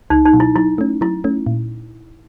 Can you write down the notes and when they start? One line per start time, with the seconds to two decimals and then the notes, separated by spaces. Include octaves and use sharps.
0.10 C#2 D#4
0.25 D#4
0.33 B2 F#3
0.40 E4
0.56 F#3 E4
0.78 A3 C#4
1.01 F#3 E4
1.24 A3 C#4
1.46 A#2